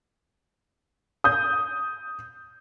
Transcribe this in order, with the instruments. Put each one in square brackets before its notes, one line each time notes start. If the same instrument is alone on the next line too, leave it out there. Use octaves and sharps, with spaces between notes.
[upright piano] D#6 G6